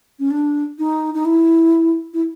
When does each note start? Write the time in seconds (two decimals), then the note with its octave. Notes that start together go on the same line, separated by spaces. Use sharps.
0.19 C#4
0.31 D4
0.79 D#4
1.14 D#4
1.25 E4
2.14 E4